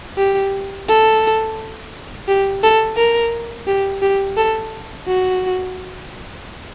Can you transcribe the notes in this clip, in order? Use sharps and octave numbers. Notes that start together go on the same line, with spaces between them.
G4
A4
G4
A4
A#4
G4
G4
A4
F#4